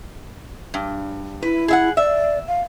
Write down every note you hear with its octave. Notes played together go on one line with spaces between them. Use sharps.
G2
E4 B4
G#4 E5 F#5
D5 E5
F5